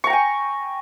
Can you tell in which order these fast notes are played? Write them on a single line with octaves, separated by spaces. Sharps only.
C#6 A#5 G5 G#5